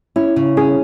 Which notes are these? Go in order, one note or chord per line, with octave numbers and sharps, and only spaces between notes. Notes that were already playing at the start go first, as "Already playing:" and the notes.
C#4 E4
C#3
C#4 G#4